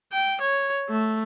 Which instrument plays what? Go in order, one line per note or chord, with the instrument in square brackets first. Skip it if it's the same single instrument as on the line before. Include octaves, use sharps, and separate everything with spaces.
[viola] G5
C#5
A3